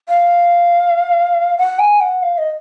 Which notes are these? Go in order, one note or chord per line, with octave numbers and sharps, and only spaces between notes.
F5
F#5
G#5
F#5
F5
D#5